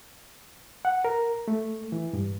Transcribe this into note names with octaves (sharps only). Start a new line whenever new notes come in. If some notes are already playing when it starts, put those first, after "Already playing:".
F#5
A#4
A3
E3
G2